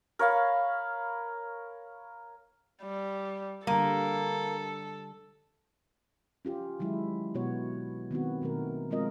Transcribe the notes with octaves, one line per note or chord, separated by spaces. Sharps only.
A#4 C#5 F5 B5
G3
D3 G3 A#3 A4
C#4 F4 G4
D#3 F#3 G#3 E4
B2 B3 F#4 C#5
D#3 B3 C4 F#4
B2 D#3 A3 A#4
F3 G#3 C4 F4 A#4 D#5